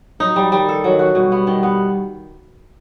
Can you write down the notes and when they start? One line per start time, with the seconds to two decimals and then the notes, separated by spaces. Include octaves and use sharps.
0.20 F#3 D#4
0.36 G3
0.52 D#3 G3
0.69 A4
0.84 D#3 F#3
0.99 F#4
1.15 B2 G3
1.32 B3
1.47 D#3
1.63 B3